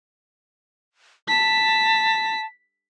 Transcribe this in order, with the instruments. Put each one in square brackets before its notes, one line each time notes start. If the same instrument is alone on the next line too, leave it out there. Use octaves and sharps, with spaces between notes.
[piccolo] A5 [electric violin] B6